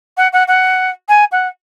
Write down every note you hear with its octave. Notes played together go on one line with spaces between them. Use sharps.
F#5
F#5
F#5
G#5
F#5